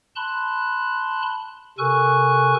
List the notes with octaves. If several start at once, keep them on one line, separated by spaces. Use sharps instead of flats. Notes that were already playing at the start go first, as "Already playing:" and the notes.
A5 B5 C6 F#6
C3 A4 A#4 G#5 C#6 F#6